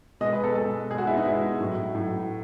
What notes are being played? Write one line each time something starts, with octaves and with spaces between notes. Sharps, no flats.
B2 G#3 D#5
B4
A4
B2 G#3 A4
B2 G#3 F#4 G#4
E4
D#4
B2 G#3 E4
A2 F#3
A2 F#3